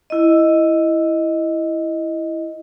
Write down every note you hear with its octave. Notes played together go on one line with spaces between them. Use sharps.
E4 D#5